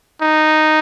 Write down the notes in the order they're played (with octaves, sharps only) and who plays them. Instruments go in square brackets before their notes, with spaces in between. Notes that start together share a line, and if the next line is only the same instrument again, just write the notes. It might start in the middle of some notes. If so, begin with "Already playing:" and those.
[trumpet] D#4